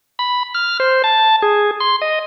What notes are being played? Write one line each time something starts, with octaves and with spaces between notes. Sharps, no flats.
B5
F6
C5
A5
G#4
C6
D#5